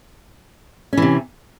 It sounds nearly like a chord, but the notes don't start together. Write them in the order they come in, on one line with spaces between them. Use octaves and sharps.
C#4 E3 C3